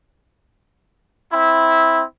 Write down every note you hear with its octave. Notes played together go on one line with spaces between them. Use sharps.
C4 E4